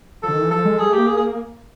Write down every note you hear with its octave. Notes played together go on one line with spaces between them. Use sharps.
D3 F3 A4
D#3
E3
F3 A4
G#3
G3 G#4
A3
A#3 G4
G#4
G#4